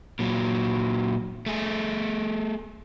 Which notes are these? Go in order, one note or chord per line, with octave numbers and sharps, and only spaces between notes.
A#2 F#3
A3 G#4